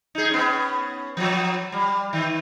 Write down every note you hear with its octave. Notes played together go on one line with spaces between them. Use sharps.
D#4 G#4
B3 C#4
F3 F#3
G3
D#3